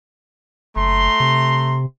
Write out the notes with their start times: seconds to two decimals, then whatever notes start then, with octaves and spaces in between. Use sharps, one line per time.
0.76 F#1 A3 A#5 C6
1.20 C3